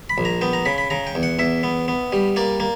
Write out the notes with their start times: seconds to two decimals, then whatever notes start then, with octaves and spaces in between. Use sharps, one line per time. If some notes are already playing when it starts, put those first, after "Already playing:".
0.10 B5
0.18 A#1
0.25 A#5
0.41 B3 G5
0.53 A#5
0.66 C#3 B5
0.78 B5
0.90 C#3 A#5
1.07 G5
1.15 E2
1.23 F#5
1.39 E2 E5
1.63 B3
1.88 B3
2.12 G3
2.36 A#3 D5
2.60 A#3